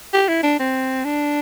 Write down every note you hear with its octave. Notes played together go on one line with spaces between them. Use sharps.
G4
E4
D4
C4
D4